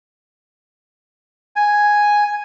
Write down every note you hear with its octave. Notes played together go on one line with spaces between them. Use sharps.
G#5